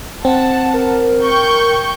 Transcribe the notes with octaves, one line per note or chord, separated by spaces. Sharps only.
C4 F#5 A5
A#4
G5 C#6 G6